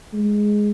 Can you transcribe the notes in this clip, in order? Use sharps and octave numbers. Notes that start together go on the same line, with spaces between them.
G#3